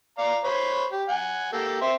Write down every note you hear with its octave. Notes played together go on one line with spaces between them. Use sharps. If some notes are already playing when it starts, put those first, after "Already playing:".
D5 F5 A#5
C5 C#5 B5
G4
F#5 G#5
A#3 G4 A4
C4 E5 C6